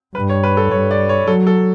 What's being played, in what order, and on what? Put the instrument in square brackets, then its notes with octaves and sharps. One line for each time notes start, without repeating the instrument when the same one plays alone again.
[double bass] G2 [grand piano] B4
[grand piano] C#5
B4
A4
[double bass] G2 [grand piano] C#5
[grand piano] D5
C#5
[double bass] F#3 [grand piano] A4
[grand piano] A4